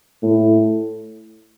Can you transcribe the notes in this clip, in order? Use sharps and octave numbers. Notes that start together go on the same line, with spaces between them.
A2